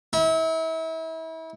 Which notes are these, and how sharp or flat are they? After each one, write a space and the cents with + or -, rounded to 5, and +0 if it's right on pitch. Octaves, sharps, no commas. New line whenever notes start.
E4 -35